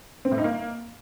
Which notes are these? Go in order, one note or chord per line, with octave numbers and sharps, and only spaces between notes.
C4
A2
D#4
A#3